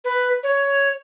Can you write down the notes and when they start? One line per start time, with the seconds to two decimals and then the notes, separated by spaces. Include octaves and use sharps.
0.05 B4
0.43 C#5